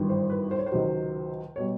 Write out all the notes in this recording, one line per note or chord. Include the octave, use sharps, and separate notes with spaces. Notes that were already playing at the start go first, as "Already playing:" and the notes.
Already playing: G#1 G2 E3 G3
C5
B4
C5
C#5
C5
C#2 C3 D#3 F#3
B2 G3 C#5